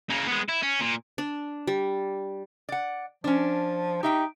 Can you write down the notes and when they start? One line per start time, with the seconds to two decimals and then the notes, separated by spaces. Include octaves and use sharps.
0.10 C#3 A#3
0.27 G#3 B3
0.49 E4
0.63 C#4
0.81 A#2
1.18 D4
1.67 G3
2.69 D5 F#5
3.24 F3 C#4 D4
4.03 D#4 G4 E5 G5